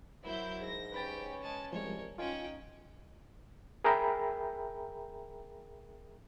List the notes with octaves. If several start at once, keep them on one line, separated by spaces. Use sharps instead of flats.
F#3 E4 A#4 C5 G6
G#2 A#6
C#4 G4 B4 G5 B5 A6
G#3 A5
C2 F3 G3 G#3 A#4 C#5
C#4 D#4 F4 G5 G#5
G#4 A#4 E5 G5 A#5 B5